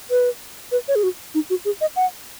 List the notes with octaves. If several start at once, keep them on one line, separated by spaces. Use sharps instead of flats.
B4
B4
C#5
G#4
F#4
D#4
F#4
G#4
D#5
F#5